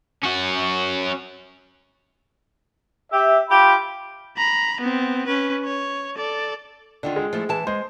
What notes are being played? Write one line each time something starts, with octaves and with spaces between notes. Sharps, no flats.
C#4 F#4
G4 E5
F4 G4 B5
A#5 B5
B3 C4
C#4 B4
C#5
A4 D5
D3 D#3 D4 F4
G#3
F3 A3 E4
E3 A5
G#3 C5